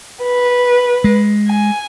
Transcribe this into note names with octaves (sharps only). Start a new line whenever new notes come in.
B4
G#3
G#5